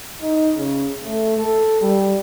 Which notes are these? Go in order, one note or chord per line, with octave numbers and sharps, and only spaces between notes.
D#4
C#3
A3
A4
G3